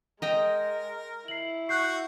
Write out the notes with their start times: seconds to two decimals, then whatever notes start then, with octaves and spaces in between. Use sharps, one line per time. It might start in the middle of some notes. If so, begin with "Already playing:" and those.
0.22 G#3 A#4 D#5 G5 A#5
1.28 E4 C7 F#7
1.69 F#4 C#6 F#6 G6 C7